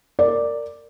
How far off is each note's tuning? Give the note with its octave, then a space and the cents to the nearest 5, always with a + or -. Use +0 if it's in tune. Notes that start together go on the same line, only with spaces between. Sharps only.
A#4 -20 D5 +0